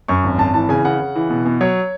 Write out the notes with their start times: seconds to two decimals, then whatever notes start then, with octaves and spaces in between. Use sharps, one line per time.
0.08 F#2 C#6
0.24 G#1
0.38 G#1 A5
0.54 E3 A5
0.69 C#3 G#5
0.85 C#3 F#5
1.00 C#3
1.16 E3
1.30 B2
1.46 B2
1.61 F#3 C#5